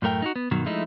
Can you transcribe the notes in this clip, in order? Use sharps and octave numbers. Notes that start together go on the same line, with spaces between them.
F#2 A2 A3 A#4 G5
D#4 E4 F#4
B3
G2 B2 D#3 F#3
F3 G#3 A3 D#4 E4